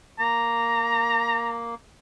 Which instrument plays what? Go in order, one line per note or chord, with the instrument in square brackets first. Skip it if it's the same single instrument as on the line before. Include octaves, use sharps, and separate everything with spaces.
[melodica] A#3 [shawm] A#5